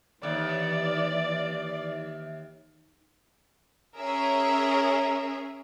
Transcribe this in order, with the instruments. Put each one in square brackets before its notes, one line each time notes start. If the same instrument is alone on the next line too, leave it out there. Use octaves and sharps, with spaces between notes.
[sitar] D#2 [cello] E3 [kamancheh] D5 [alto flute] E5
[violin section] C#4 G#4 A#4 E5